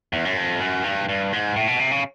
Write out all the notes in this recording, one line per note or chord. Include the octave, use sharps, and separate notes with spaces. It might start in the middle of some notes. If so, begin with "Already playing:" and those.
E2
F#2
F2
F#2
G2
G2
G#2
A2
B2
C3
C#3